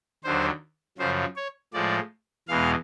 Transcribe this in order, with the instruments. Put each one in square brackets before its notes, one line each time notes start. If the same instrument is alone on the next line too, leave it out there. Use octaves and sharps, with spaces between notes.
[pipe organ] D#2 D3 F#3 C5
F#2 C#3 F3 C5
C#5
A2 F3 G#3 D5
E2 B2 G#3 F5